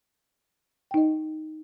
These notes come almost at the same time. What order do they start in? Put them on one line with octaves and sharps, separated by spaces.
G5 D#4 D#5